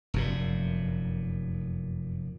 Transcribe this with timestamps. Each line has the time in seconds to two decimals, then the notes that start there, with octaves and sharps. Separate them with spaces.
0.14 F1 F#2 A#2